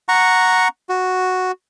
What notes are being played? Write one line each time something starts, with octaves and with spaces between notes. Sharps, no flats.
F#5 A#5 C#6
F#4